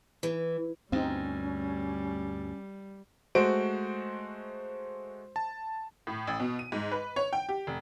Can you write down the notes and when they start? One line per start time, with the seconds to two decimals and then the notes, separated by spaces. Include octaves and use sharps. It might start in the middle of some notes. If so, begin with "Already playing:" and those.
0.23 E3
0.92 D2 G2 G3 C4 C#4 D#4
3.35 G#3 A3 F#4 C5 D7
5.36 A5
6.07 A2
6.27 A1
6.40 B2
6.59 D#7
6.72 G#2
6.92 B4
7.16 C#5
7.33 G5
7.49 G4
7.67 F1